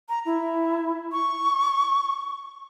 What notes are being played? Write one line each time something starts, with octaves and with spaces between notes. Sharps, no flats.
A#5
E4
C#6